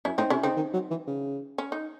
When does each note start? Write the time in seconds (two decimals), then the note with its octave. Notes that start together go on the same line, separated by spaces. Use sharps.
0.05 F#2 C#4 E4
0.18 A2 C4 D#4
0.30 C3 C#4 E4
0.43 C#3 C4 D#4
0.56 D#3
0.74 F#3
0.90 E3
1.07 C#3
1.58 C#4
1.72 D#4